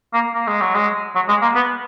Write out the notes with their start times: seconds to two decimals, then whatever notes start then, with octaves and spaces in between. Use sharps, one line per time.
0.13 A#3
0.34 A#3
0.47 G#3
0.61 F#3
0.75 G#3
1.15 F#3
1.28 G#3
1.42 A#3
1.55 B3